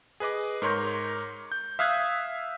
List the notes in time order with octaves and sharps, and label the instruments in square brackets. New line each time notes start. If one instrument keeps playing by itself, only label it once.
[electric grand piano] G#4 B4 D#5 D6
G#2 A#4 C#5 C6 C#6 G6
G6
E5 F5 D#6 F#6 G#6